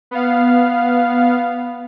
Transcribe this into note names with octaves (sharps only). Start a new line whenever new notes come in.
B3 F5